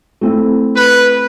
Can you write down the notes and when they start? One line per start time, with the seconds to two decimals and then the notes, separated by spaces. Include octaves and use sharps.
0.21 A3 C4 E4
0.75 B4